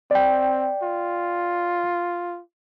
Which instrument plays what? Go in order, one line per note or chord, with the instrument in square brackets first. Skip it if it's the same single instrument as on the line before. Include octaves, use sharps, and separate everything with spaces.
[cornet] C4 [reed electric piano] D5 G5
[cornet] F4